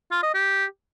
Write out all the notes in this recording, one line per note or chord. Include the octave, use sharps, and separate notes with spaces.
F4
D#5
G4